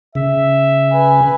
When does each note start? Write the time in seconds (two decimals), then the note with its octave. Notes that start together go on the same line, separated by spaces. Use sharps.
0.15 C#3 E5
0.91 B4 G#5